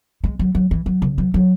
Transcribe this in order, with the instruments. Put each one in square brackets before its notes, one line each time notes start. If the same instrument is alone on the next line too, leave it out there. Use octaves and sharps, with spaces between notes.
[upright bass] G#3
F#3
F#3
E3
F#3
C#3
F#3
F#3